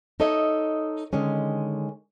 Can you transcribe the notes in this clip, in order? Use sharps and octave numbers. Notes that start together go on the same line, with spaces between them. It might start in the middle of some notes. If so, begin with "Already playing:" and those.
D#4 A4 C#5 D#5 E5
D3 D#3 G#3 C#4